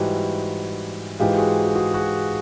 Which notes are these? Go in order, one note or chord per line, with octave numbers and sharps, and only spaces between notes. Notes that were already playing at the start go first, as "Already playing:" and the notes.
Already playing: G#2 E3 G3 E4 F#4 G4
G#2 E3 G#3 F4 G4
F#4 G#4
G4
F#4 G#4
F#4 G#4